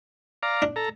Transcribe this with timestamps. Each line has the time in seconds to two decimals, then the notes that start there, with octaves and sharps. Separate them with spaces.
0.43 D5 F5 A#5
0.62 D4
0.76 A4 A#5